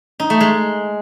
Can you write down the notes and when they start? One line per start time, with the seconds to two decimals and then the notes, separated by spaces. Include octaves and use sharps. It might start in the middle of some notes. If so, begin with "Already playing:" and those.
0.20 D#4
0.30 A3
0.40 G#3